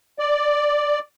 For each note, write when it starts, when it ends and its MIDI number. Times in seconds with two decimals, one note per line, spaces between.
0.19 0.99 74